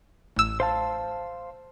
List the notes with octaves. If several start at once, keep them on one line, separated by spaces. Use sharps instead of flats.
A1 E6
C5 F5 A5